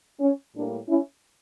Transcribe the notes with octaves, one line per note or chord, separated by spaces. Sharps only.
C#4
A2 G3 A#3 D4
C#4 E4